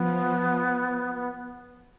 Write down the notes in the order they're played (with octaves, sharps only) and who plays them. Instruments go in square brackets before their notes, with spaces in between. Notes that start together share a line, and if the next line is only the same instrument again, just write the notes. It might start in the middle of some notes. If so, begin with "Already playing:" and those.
Already playing: [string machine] F3 [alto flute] B3
[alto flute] B3